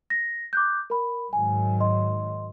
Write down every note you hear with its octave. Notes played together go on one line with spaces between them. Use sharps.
A#6
D6 F#6 G6
A#4 B5
G#2 D#3 F#3 G#5
D#5 C6